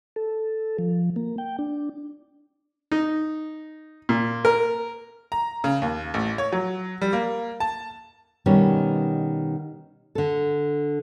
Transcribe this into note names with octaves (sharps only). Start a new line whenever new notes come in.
A4
F3
A#3
G5
D4
D#4
A#2
A#4
A#5
C#3
D#2
A1
C#5
F#3
G3
A#3
A5
B2 D#3 G3 C#4
D3 A4